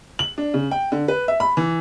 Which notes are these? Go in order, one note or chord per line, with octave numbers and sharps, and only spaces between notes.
F#7
D4
C#3
G5
D3
B4
E5
B5
E3